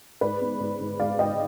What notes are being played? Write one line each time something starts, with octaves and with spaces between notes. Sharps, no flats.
G#2 B4 D5
B3
G#2
G#2
G#2 D5 F5
G#2 D#5 G5